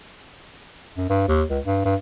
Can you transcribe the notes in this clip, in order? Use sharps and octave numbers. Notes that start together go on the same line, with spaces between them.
F#2
G2
D#2
C#2
G2
G2